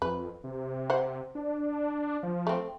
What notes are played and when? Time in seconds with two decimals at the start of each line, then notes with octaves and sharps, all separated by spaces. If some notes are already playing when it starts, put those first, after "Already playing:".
0.02 F2 B4
0.44 C3
0.90 C5 F#5
1.35 D4
2.23 F3
2.47 A3 C4